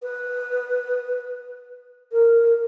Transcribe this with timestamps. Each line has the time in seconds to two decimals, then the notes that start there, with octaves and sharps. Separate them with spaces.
0.03 B4
2.12 A#4